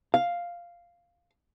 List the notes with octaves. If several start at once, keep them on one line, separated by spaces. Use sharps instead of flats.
F5